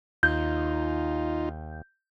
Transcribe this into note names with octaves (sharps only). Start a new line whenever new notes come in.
D#2 D#4 F4 G6